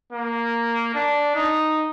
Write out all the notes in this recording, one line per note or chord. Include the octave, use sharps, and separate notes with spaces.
A#3
D4
D#4